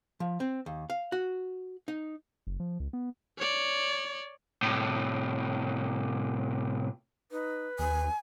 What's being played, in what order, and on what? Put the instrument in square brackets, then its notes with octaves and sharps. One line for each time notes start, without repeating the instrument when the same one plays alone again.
[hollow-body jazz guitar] F3
C4
D#2
F5
F#4
D#4
[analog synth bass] F#1
F3
C#2
B3
[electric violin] C#5 D5
[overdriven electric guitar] A2 C3
[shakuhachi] D#4 [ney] B4
[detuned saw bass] D#2 [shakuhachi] G#5